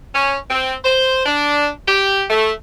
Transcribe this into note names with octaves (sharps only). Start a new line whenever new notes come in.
C#4
C4
C5
D4
G4
A3